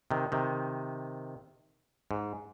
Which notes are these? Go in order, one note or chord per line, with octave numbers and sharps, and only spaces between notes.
C3 D#3
C3 D#3
G#2